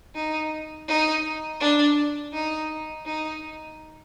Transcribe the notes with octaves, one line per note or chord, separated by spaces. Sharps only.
D#4
D#4
D4
D#4
D#4